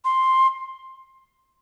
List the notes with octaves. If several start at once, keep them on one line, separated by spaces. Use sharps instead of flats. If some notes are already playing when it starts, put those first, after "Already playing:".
C6